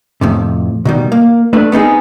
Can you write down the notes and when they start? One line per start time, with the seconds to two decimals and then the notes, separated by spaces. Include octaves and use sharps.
0.21 F2 A2 C3
0.85 B2 D#3 G3
1.12 A#3
1.53 A3 D4 B4
1.72 B3 C4 D#4 G#4